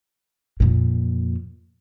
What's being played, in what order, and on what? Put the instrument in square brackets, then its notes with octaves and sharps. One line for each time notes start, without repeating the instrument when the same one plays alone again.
[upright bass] F2 A#2